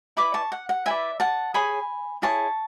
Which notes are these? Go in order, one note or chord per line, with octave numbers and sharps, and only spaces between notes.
E4 B4 D5 B5 D6
A5 C#6
F#5
F#5
E4 B4 D5 E5 G#5
F#5 A5
G#4 C#5 G#5 B5
E4 G#4 C#5 A5 C#6